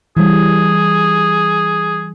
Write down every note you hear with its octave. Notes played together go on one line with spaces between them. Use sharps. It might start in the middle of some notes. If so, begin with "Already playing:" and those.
E3 G3 G#4